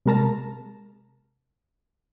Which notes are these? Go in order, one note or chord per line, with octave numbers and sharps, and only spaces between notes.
C3 G#3 A#4 A5 A#5